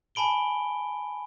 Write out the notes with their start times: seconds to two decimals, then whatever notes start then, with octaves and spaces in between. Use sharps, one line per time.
0.15 G#5 A5 B5 D7 G7